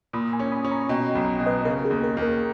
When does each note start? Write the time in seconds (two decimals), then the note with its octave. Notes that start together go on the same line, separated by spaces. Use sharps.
0.13 A#2 B5 D#6
0.32 G#5 B5
0.39 C#4
0.51 B5 D#6
0.65 C#4
0.71 A#5 C#6
0.89 B2 D#5 G5
1.15 B1
1.40 B2
1.46 B4 D#5
1.65 C#3 A#4
1.85 G#4
1.91 D#2
2.04 A#4
2.17 D#2
2.22 A#4